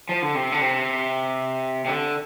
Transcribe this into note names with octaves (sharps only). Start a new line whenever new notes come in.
F3
D3
C3
D3
C3
C3
D3